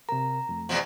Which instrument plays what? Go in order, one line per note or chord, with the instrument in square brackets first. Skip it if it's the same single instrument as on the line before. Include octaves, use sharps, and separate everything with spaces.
[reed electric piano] C3 A#4 [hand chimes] A#5
[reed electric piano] F2 A3
[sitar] E2 B2 F3